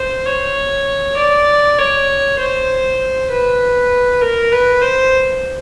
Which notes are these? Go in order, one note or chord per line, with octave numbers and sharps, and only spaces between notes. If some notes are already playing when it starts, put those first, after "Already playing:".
Already playing: C5
C#5
D5
C#5
C5
B4
A#4
B4
C5